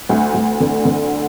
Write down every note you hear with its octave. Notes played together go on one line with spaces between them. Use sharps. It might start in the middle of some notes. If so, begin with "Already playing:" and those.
D2
D2
D3
D3